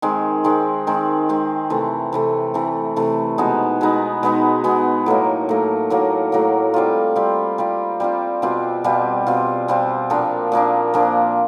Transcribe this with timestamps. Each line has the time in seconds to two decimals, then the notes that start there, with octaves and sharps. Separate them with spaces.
0.02 D#3 G#3 C4
0.44 D#3 G#3 C4
0.87 D#3 G#3 C4
1.29 D#3 G#3 C4
1.70 C3 E3 A3
2.13 C3 E3 A3
2.54 C3 E3 A3
2.96 C3 E3 A3
3.38 B2 G#3 B3 D#4
3.81 B2 G#3 B3 D#4
4.23 B2 G#3 B3 D#4
4.64 B2 G#3 B3 D#4
5.06 A2 F#3 A#3
5.49 A2 F#3 A#3
5.90 A2 F#3 A#3
6.32 A2 F#3 A#3
6.74 G3 C4 F4
7.16 G3 C4 F4
7.58 G3 C4 F4
8.00 G3 C4 F4
8.42 B2 G3 C4 F4
8.84 B2 G3 C4 F4
9.27 B2 G3 C4 F4
9.68 B2 G3 C4 F4
10.10 A#2 F3 A#3 D4
10.52 A#2 F3 A#3 D4
10.94 A#2 F3 A#3 D4